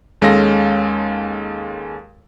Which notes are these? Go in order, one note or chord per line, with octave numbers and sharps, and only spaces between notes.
D#2 G#3 C#4 A4 F5 A#6